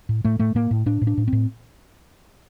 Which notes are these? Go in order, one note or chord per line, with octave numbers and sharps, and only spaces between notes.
A2
A2 A3
A2 A3
A2 A#3
A2
A2 D4
A2
D4
A2
C4
A2